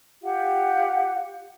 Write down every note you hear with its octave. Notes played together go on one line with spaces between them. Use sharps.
F4 G4 F5 F#5